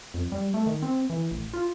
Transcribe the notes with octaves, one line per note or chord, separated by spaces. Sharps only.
F2
G3
A3
D#3
C4
E3
A1
F4